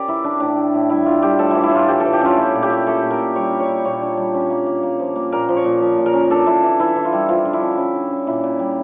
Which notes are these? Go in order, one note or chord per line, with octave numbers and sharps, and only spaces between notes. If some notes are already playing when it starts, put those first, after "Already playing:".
Already playing: C#4 G4 A#4 D5
E3 E4
E3 D4
A2 D4
A2
A2
G3 E4
A2 F4
G3 G4
A2 A4
E3 E4
E4
A2 F4
E3 G4
A4
E3
G4
C#4 F4
A3 E4
A#2
G4
A3
A3 A4
A#2
A#4
A#2
G3 C#5
D4
C#5
D4
A#2 C#5
D4
G3
C#4
A#3
A#3
A#3
F3
A#3
A#2 A#4
F3
C#5
A#2
F3
A#2
A#4
C#4
D4 A4
D4 E4
E3
E3 E4
E3
F4
G3
F3 F4
D3
E4
C#4
C#4 E4
D3
C#4
A#2 E4
A#2
G3